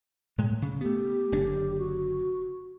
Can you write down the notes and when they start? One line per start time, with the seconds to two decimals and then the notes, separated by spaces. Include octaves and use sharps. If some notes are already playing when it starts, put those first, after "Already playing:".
0.38 A2 G#3
0.62 C#3
0.81 A3 B3 G4
1.32 F#1 D3 D4
1.78 F#4